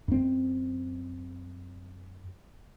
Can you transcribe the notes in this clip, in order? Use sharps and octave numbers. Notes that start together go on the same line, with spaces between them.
F#2 C4